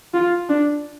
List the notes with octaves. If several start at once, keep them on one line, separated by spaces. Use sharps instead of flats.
F4
D4